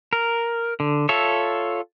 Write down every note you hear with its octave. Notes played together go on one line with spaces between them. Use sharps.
A#4
D3
F4 A4 C#5 E5